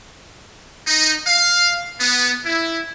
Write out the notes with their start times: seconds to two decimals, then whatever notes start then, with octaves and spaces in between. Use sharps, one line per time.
0.87 D#4
1.27 F5
2.00 B3
2.46 E4